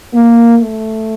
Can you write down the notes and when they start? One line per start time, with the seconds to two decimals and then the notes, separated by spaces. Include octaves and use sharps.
0.14 A#3
0.57 A3